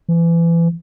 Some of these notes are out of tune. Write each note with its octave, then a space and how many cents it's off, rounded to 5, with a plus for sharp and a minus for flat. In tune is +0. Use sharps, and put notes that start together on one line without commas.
E3 +30